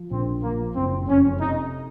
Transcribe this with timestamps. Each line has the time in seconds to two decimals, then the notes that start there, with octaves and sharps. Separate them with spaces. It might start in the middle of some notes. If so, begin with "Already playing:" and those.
Already playing: F3
0.11 A#1 C4
0.43 F3 A#3
0.75 F#1 C4
1.08 F2 C#4
1.41 C3 D#4